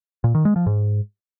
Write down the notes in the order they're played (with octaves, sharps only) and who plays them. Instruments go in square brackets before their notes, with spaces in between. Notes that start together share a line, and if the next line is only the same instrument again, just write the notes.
[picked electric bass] A#2
D#3
G#3
F3
G#2